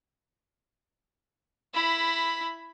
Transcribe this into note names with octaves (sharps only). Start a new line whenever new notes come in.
E4 B5